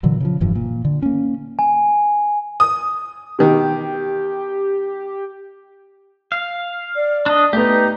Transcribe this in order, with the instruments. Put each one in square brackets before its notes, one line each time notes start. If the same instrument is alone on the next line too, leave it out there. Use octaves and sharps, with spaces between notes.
[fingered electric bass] A#2 D3 E3 F#3
C#3 E3 F3
F1 G2 E3 F3
A#2
D3
A#3 C#4
[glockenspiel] G#5
[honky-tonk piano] D#6
[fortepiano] B2 D#3 [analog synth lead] G4
[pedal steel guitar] F5
[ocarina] D5
[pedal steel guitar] D4 D#5
[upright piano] A3 B3 [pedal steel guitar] D#4 G4